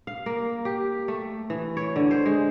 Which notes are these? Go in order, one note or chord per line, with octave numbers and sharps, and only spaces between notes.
F5
A#3
G4
A3
E3
C#5
D3
C5
G#3